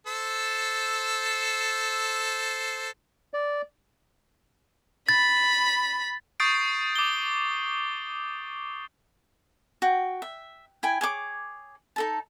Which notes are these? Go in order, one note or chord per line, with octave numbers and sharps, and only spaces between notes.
A4 C5 E6
D5
B5 A6
C#6 D#6 G6 A6 C7 D7
D6 G7
F#4 G5
E5
E4 G5 G#5
G#4 C#5 D6
D#4 A4 A5